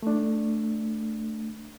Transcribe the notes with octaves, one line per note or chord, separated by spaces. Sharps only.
A3 D4